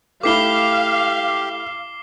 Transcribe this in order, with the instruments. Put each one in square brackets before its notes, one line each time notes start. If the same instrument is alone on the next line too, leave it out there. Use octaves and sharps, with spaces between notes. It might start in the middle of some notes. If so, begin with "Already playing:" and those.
[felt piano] A3 E4 B5 [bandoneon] G4 [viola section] F5 [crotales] D6 C7 G7